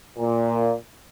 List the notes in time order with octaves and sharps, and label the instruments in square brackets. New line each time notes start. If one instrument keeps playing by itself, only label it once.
[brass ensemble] A#2